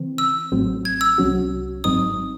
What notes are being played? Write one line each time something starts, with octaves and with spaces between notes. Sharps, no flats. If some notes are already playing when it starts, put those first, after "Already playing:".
Already playing: C#3 E3 C4
E6
A1 A2 F#3 C4
G#6
E6
C2 C3 F#3 C#4 F#4
G#1 G#2 F#3 C4 D#4 D#6